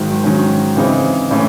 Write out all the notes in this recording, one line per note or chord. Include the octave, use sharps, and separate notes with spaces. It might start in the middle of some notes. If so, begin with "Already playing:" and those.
Already playing: G#1 G#2 D#3 F#3
G#2 D#3 F#3 C#4
C#3 E3 C4 D#4
A2 E3 A3 C#4